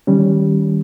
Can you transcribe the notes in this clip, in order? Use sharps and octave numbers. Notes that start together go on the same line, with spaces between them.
D#3 G3 C#4